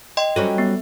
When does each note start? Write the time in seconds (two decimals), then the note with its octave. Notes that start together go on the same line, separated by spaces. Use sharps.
0.17 D#5 G5 C6
0.36 F#3 G3 C#4 A4
0.58 B3